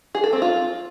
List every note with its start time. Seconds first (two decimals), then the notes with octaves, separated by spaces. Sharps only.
0.15 G#4
0.24 A4
0.33 C4
0.42 F4